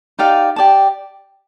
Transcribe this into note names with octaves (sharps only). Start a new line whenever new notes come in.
D#4 G4 D5 F5
G4 D5 A5